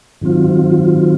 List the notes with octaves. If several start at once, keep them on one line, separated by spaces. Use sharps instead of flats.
G#2 D#3 F#3 C4 F4